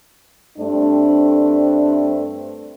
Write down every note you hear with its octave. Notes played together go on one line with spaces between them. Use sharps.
G2 A3 C4 D4